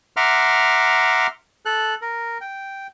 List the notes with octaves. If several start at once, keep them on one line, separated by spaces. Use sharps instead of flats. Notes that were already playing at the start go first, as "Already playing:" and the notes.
E5 F#5 A#5 C6 D6 F6
A4 F#6
A#4
G5